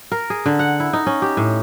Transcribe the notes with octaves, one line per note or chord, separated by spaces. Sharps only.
A#4
G#4
D3
F#5
E4
D#4
C#4
G4
A2